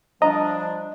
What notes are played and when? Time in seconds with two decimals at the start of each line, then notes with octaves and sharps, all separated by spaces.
0.22 F3 G3 D4 D#5 A#5